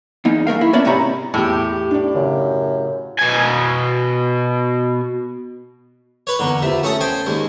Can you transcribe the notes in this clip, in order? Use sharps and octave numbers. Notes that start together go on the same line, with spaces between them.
E2 A#3 D#4
F#2 A3 A#4 F5
E4
A#3 B3 C#4 D4 D5 E5
G#2 C3 G4 C#5 A#5 B5
E2 A2 G4
D4 D5
F#2 C#3
B2 G#5
B4 C#5
E2 D3 A#3 F#5
C3 F4 B4 E5
A3 C#4 A4 C#6 D#6
C5 G5 G#5
D#2 G#2